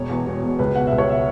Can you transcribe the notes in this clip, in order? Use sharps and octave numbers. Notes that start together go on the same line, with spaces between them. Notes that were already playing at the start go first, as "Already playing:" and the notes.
Already playing: E1 C#5
E2 B2
E1
E2 B2
C#2 B4
B2 F#5
E5
C#2
C#5
B2 E5